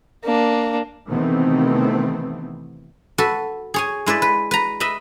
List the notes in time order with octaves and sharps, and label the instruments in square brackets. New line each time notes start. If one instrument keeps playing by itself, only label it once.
[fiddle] A#3 D4
[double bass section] C3 D#3 E3 A3 B3 C4
[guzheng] F#4 A4 B4
G#4 C#5 G#5
G#3 E4 B4 D5
B4
B4 A#5
B4 D#5 E5 B5